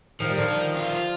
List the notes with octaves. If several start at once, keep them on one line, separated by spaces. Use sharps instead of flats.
D#3 F3
G3
D3 F3
D#3
F4